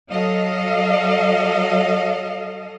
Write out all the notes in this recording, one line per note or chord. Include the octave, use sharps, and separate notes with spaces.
F#3 A4 D#5 F5